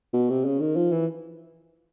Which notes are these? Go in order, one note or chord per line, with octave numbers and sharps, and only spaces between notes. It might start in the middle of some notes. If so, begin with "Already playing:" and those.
B2
C3
C#3
D#3
F3
E3